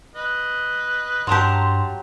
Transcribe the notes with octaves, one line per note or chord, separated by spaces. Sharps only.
B4 D#5
G2 F#3 G4 A5 A#5 C6